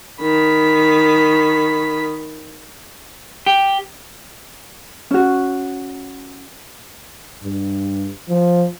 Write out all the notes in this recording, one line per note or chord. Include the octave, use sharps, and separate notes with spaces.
D#3 B5
G4
C#4 F#4
G2
F3